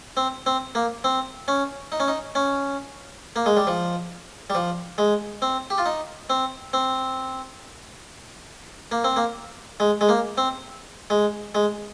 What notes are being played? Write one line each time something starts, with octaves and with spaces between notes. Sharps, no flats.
C4
C4
A#3
C4
C#4
D#4
C#4
D#4
C#4
A#3
G#3
G3
F3
G3
F3
G#3
C4
G4
F4
D#4
C4
C4
A#3
C4
A#3
G#3
G#3
A#3
C4
G#3
G#3